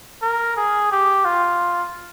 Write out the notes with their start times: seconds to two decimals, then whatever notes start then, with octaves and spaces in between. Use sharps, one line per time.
0.22 A#4
0.57 G#4
0.92 G4
1.25 F4